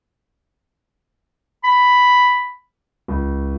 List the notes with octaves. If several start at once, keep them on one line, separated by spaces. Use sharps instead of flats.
B5
C#2